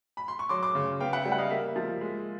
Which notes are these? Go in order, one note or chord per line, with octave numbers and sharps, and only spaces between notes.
B5
C6
C#6
F#3 C6 D6
C6 D6
C#3
B3 F5 G5
E5 F#5
G3 E5
F#5
D#5 F5
A#3 E5
F3
G#3